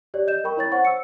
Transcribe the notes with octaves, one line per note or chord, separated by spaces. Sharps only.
G4 C#5 D5
D#5 G6 E7
A#4 G5 B5 C#6
E4 C#5 A6
C5 C#5 F#5 C#6
E6 C#7